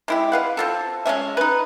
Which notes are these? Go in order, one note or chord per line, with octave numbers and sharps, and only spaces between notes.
G#3 E4 G4
B4 F5 F#5
C4 F4 A4
G#3 B3 C#4 E5
D#4 B4